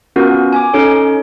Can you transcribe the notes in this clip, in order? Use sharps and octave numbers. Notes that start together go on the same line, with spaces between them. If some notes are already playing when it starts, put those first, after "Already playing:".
B3 C#4 F4 F#4 A#4
G#5 D6
C#4 D#4 A4 C#5